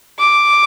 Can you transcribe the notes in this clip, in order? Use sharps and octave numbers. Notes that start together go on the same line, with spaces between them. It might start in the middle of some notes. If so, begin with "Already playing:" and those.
D6